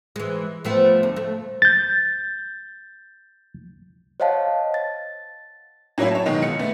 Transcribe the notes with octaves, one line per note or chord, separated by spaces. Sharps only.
E3 G#3
F3 A3 B3
D2
A3
G6 A6
C5 C#5 D#5 F5 F#5 A5
A6
A2 F#3 A#3 C#4 E4
C#5 A5
B2 D#3 G#3
C#2 C#7
A3 B3